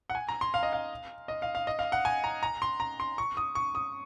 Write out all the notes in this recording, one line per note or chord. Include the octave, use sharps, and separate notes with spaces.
F#5
G#5
A#5
C6
F5
D#5
F5
D#5
F5
F5
D#5
F5
F#5
G#5
A#5
A#5
C6
A#5
C6
C#6
D#6
C#6
D#6